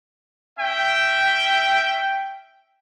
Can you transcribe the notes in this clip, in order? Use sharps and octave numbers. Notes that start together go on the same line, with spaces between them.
C#4 E5 G5